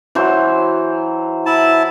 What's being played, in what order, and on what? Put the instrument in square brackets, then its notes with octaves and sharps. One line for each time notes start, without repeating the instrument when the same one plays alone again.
[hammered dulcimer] E3 F#3 C5
[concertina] E4 A5